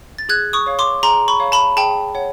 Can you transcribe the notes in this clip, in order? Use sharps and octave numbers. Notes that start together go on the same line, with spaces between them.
A6
G#4 F#6 G#6
C#6 D#6
C#5 F5
C6 D6
G#4 A#5 C6
B5 C#6
C#5 F5
A5 B5
G#4 G5 A5
C#5 F#5